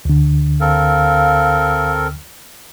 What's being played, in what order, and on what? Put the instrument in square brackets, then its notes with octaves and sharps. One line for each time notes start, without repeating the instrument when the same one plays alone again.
[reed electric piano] D2 D3
[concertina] C4 A4 A#4 [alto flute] F5